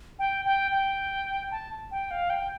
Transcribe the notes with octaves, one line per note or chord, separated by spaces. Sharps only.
G5
G5
G5
A5
G5
F5
G5